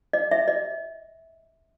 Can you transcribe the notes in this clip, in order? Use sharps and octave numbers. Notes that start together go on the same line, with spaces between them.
D#5
E5
D#5